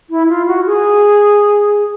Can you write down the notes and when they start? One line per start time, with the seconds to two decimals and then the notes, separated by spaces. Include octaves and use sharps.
0.10 E4
0.29 F4
0.47 F#4
0.66 G#4